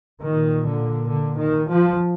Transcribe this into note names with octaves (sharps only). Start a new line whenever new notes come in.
A#2 D#3
D3
D3
D#3
F3